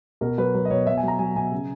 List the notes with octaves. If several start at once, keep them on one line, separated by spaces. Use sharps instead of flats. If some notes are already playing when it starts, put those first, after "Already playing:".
B2 A#4
F#3 B4
F#3
D#5
B2 C#5
B2 E5
G#5
F#3 A#5
F#3 G#5
B2 G#5
C#3